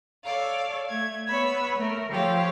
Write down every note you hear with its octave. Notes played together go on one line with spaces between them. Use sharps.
A4 C#5 D5 F5
A3 G#6
B3 B4 C#5 B5 E6
A3 A#4
F3 G4 A4 C5 C#5 F5